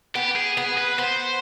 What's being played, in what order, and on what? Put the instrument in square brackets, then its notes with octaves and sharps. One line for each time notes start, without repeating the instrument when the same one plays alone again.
[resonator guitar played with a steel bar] B3 [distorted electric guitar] G4
[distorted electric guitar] G#4
[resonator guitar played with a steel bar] B3 [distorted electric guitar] G#4
[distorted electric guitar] B4
[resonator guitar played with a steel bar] B3 [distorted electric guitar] C5